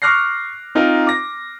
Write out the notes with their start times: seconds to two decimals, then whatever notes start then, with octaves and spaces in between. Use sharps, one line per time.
0.02 C#6 D6 F6 F#6 A#6 C7
0.75 C4 D#4 F4 A#4
1.07 D6 A#6